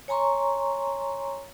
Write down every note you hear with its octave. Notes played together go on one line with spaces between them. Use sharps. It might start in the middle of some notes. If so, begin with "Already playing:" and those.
C#5 G#5 A#5 C6 C#6